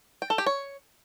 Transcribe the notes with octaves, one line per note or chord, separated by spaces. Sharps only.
G5
A4
G4
C#5